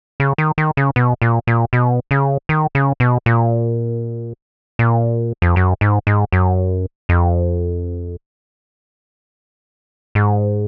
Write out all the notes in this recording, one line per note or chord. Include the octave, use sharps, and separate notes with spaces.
C#3
D#3
D#3
C#3
B2
A#2
A#2
B2
C#3
D#3
C#3
B2
A#2
A#2
F2
F#2
G#2
G#2
F#2
F2
G#2